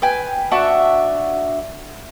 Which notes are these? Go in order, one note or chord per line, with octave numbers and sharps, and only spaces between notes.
B4 G5 G#5
D4 F#4 E5 A5